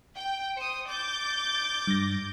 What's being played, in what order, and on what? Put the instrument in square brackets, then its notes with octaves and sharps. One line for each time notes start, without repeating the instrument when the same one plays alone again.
[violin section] G5
[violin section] C5 D#6 [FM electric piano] C#7
[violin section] D6 G6 A6
[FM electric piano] G2 A#6